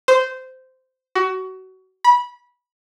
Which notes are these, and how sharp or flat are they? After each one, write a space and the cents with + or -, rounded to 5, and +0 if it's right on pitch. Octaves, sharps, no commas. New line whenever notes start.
C5 -15
F#4 +25
B5 -20